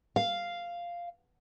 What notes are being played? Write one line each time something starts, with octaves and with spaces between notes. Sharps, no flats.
F5